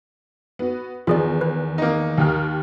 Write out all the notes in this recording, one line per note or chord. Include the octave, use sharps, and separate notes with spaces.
B3 F#4
E2 D#3 F4 G#4 D5
B4
A#3 D#4
D#2 G4 F6